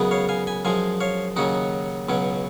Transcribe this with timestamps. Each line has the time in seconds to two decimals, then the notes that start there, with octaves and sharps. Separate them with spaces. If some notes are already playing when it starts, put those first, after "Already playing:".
Already playing: F#2 C#3 G#3 B3
0.11 C#5 F5
0.29 F5 G#5
0.47 G#5 B5
0.65 F#2 F3 G#3 F5 G#5
1.01 C#5 F5
1.36 D#2 C#3 F#3 C#4 D#4 F#4
2.09 C#2 B2 F#3 C#4